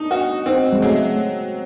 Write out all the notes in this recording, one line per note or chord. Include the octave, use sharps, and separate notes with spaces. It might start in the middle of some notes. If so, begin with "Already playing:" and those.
Already playing: D4 D#4
F#4
C4 D#4
G#3
F#3 A3